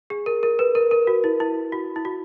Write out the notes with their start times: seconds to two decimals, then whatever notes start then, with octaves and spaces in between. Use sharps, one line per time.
0.10 G#4
0.26 A#4
0.43 A#4
0.59 B4
0.75 A#4
0.91 A#4
1.07 F#4
1.24 E4
1.40 E4
1.72 F#4
1.96 E4
2.05 F#4